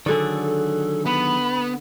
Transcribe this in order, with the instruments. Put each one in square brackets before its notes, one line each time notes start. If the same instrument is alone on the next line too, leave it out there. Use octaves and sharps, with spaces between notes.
[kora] D3 D5 [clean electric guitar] D#3 F#3 G#4 [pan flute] A4
[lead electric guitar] B3 [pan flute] B5